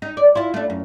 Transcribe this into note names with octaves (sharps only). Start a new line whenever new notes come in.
D#4
D5
E4 F4
A3 D4
F#2